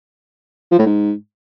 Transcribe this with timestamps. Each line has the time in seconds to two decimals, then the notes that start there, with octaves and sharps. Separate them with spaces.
0.72 F3
0.79 A2
0.87 G#2